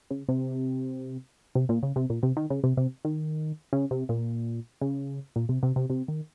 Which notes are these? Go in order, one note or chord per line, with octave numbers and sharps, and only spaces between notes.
C#3
C3
C3
A#2
C#3
C3
A#2
C3
D#3
C#3
C3
C3
D#3
C#3
C3
A#2
C#3
A#2
C3
C3
C3
C3
D#3